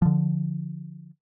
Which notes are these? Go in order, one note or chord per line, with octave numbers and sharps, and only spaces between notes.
D3 F3